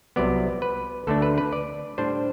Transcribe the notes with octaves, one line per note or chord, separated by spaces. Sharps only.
C2 C3 F#3 B3 D5
B4
D2 D3 A3 D4 A4
B4
B4
D5
A2 G3 D4 C5